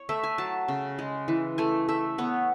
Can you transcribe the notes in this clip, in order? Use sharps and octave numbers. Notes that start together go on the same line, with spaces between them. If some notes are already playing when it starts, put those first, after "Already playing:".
Already playing: C#5
A3 E5
G#5
F#3 A5
C#3
G#3
E3
A3 G#5
A3 E5
B3 C#5